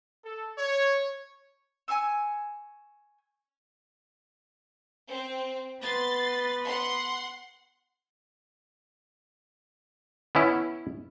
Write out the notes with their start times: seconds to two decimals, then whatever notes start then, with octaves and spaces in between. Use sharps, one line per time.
0.24 A4
0.59 C#5
1.88 G#5 A5 C#6 E6
5.09 C4
5.81 B3 B4 C6 A6
6.65 F#5 C6
10.35 B3 C#4 E4